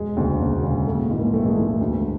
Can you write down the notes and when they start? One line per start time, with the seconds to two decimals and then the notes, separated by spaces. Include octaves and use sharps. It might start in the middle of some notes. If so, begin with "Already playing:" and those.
Already playing: E1 G#3
0.17 D2 C#3
0.41 E1
0.63 D2 C#3
0.87 A#1 A3
1.02 A3
1.10 G#2 E3
1.18 A#3
1.33 A#1 A3
1.45 G#3
1.56 G#2 E3 A3
1.81 D2